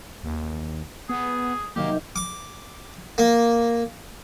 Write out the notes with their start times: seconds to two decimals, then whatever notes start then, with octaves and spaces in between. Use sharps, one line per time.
0.23 D#2
1.09 B3 G#4
1.76 C3 D#3 F#3 A#3 G4
2.16 D6
3.18 A#3